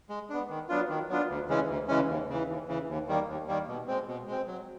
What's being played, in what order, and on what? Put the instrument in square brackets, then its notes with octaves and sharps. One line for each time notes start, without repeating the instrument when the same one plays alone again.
[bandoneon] G#3
B3 D4
D#3
F#3 B3 D4 F4
D#3
F#3 B3 D4 F4
D2
C#3 E3 G#3 C#4
D2
C#3 E3 G#3 C#4
D#2
C#3 E3
D#2
C#3 E3
D#2
D#3 G3 A#3
D#2
D#3 G3 A#3
B2
G#3 C4
B2
G#3 C4
F#3